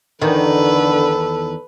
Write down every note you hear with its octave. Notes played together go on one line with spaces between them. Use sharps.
E2 D3 D#3 A4 B4